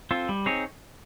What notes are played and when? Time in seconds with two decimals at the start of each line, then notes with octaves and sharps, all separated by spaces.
0.11 C4 F4 A4
0.29 G3
0.46 C4 D#4 G#4 C#5